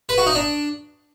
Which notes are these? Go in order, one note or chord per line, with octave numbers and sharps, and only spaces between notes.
B4
F#4
D#4
D4